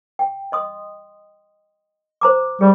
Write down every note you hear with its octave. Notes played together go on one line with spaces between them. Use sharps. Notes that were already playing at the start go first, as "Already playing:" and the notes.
G5
D#5 C6 D#6
C5 A#5 D6
G3 G#4